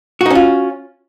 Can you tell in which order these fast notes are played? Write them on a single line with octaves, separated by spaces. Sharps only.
F#4 D#4 C#4 F4